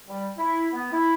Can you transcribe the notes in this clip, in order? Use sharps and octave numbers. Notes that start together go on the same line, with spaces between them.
G3
E4
B3
E4